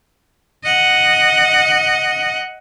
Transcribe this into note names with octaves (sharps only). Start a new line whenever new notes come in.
D#5 F#5